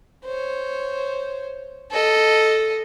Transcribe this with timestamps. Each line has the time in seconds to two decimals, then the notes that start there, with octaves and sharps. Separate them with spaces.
0.25 C5 C#5
1.91 A4 D#5